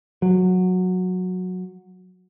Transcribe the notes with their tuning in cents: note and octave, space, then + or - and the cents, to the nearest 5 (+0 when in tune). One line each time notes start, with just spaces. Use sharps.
F#3 -15